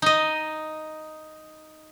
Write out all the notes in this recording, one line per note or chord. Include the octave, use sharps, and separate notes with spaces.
D#4 D#5